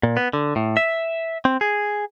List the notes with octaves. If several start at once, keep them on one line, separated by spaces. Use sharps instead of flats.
A#2
B3
D3
A2
E5
C4
G#4